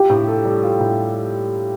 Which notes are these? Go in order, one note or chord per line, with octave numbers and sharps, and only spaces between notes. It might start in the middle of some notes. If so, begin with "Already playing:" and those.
Already playing: F4 G4
A2
A4
G3
F4
A2